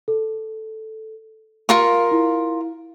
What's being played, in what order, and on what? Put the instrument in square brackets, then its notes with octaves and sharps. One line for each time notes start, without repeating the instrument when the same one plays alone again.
[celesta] A4
[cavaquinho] F4 A#4 C#6 [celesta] F5
[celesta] E4